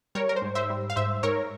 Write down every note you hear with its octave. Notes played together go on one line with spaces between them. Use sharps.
G3 A#4 C#5
A#4
C5
G#2
C5 E5
G3
F5
G#2 C5 E5
G#2 A#4 C#5